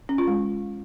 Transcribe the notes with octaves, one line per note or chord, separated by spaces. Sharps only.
C#4
F4
G#3